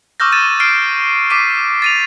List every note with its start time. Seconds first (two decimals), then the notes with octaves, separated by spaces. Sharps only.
0.20 C#6 D6 E6 F6 G6 A#6
0.32 A6 D#7 E7
0.60 F6 C7 D7
1.30 D6 B6 C7 D#7
1.82 A6 D#7 F7